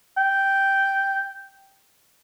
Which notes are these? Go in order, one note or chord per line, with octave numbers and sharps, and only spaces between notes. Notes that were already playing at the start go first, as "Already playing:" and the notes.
G5